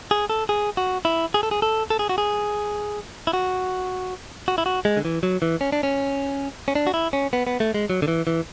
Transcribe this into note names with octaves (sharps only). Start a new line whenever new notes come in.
G#4
A4
G#4
F#4
E4
G#4
A4
G#4
A4
A4
G#4
F#4
G#4
E4
F#4
F#4
E4
F#4
G#3
D3
E3
F#3
E3
C#4
D4
C#4
C#4
D4
F#4
E4
C#4
B3
B3
A3
G#3
F#3
D3
E3
E3